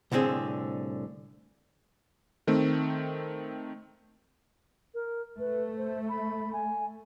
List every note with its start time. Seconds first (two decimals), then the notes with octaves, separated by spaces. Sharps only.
0.12 C2 A2 D3 C4 G#4
2.47 D#3 A3 C4
4.94 A#4
5.39 A3 B4
5.77 C5
6.09 B5
6.53 G#5